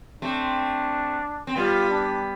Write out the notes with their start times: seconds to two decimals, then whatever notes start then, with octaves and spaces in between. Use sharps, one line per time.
0.22 A3 C4 D4
1.47 C4
1.56 G3 B3 F4
1.91 D4